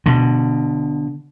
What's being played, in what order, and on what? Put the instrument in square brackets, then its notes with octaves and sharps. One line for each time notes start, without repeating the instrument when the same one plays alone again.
[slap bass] B2 D3